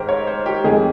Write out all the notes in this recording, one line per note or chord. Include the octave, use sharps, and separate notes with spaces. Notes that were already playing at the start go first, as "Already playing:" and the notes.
Already playing: G#2 D#3 G4 A#4 C5
C#5
C5
G4
F2 D#3 G#3 G#4